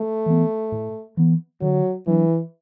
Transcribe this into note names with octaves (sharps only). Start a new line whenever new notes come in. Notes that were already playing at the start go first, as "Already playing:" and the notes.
Already playing: A3
E3 B3
A2
E3 B3
D3 F#3
E3 F#3 D4